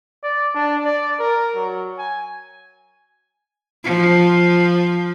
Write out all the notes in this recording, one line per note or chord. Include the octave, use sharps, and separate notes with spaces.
D5
D4
D5
A#4
F#3
G#5
F3